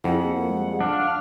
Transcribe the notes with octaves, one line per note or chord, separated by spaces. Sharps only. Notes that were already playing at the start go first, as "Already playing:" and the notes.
F2 E4 F#4 G#4 F#5
A#3
G3 G#3
D4 F5 F6